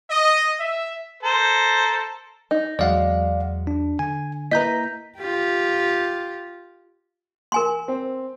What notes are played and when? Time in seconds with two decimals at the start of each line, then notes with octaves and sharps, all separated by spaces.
0.11 D#5
0.60 E5
1.23 A4 A#4 C5
2.51 D#4
2.79 E2 F#3 G#3 D5 F5 F#5
3.67 D4
3.99 D3 G#5
4.51 A#3 E4 B4 D#5 E5 A#5 G6 B6
5.18 F4 G4
7.52 A#4 G#5 C6
7.88 C4